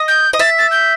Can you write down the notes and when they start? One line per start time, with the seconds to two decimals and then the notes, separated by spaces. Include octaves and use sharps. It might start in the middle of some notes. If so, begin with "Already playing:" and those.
Already playing: D#5
0.08 G6
0.33 D#5
0.39 E5 A6
0.58 A6
0.71 G6